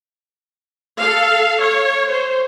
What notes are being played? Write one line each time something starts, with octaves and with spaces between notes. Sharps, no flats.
A4 F5
C#5
C5